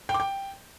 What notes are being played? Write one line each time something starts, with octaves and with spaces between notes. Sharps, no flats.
G5
D6
G5